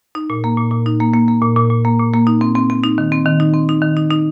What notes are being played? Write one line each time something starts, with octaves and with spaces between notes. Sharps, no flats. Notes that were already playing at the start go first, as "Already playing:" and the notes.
D#4
A#2
A#3
A#2
A#2
D#4
A#3
A#3
A#3
A#2
A#2
A#2
A#3
A#2
A#3
D#4
C4
C4
C4
D#4
D#3
C4
D#3
D#4
C4
D#4
D#3
D#4
D#4